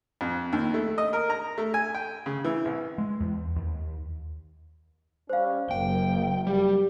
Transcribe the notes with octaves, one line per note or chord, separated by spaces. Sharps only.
F2
D#2
A3
D#5
A#4
A#5
A3
G#5
G5
C#3
E3
C2
G#3
E2
D#2
G3 C#4 C5 F5
F#1 A#3 G5
G3 G4